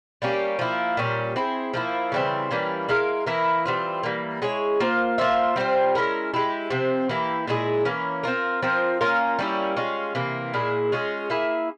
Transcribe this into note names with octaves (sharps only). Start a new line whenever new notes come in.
G3 A#3 C#4 G4
F3 A#3 E4
A#2 G3 C#4 G4
C4 E4 G#4
F3 A#3 E4
C#3 E3 G3 C4
E3 G3 A#3 C#4
G#3 E4 A#4 F5
E3 A#3 E4 A#4
E3 G3 C4 F4
E3 G3 A#3
G#3 E4 G#4 C#5
A#3 F4 C5
A#3 F4 C5 E5
G3 C4 F4 C5
G#3 C#4 E4 A#4
G#3 E4 G4
C3 F3 C4
E3 A#3 E4 G4
A#2 G#3 E4 G#4
E3 A#3 C#4
C4 F4 A#4
F3 C4 F4 A#4
A#3 C#4 F4 A#4
G3 A#3 C#4 E4
G#3 C#4 F4
C3 E3 A#3
A#2 G#3 E4 G#4
G#3 C#4 F4 G#4
A#3 E4 G#4 E5